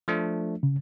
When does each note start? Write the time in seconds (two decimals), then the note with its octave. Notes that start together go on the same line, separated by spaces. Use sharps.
0.08 F3 A3 D4
0.63 C#3